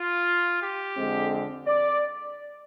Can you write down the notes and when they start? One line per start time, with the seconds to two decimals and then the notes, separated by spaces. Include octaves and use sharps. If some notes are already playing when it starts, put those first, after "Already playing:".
Already playing: F4
0.62 G4
0.97 F2 D3 G#3 C4
1.67 D5